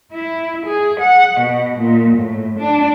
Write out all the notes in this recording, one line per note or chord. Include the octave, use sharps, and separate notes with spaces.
E4
G#4
F#5
B2
A#2
A2
D4